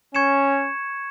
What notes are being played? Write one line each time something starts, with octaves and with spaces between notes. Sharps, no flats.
C#4 C#6 G#6 C#7 E7